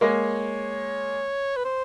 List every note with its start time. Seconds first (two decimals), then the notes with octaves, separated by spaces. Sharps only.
0.01 G#3 A#3 C#5
1.56 B4
1.65 C5